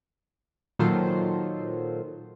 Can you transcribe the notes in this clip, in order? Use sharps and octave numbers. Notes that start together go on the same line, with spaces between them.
A#2 D#3 F#3 F4 A4 C5